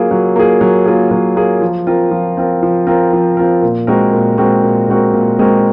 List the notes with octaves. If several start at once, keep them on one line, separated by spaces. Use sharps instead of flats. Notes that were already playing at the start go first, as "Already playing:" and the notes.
Already playing: F#3 A#3 F4 G#4
F#3
A#3 F4 G#4
F#3
A#3 F4 G#4
F#3
A#3 F4 G#4
F3
C4 F4 A#4
F3
C4 F4 A#4
F3
C4 F4 A#4
F3
C4 F4 A#4
A#2
G#3 C4 F#4 A#4
A#2
G#3 C4 F#4 A#4
A#2
G#3 C4 F#4 A#4
A#2
G#3 C4 F#4 A#4